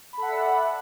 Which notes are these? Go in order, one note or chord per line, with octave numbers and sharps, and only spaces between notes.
A4 D5 E5 F#5 B5